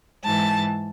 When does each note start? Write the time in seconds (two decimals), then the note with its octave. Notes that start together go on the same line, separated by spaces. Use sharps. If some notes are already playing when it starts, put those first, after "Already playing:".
0.24 G#2 E3 A5